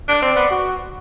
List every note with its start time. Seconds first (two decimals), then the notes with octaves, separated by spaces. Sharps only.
0.08 D4
0.22 C4 D5
0.36 B3
0.51 F#4